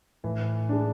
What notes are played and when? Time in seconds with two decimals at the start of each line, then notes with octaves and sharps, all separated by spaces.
0.24 A2 E3
0.69 G#3 D4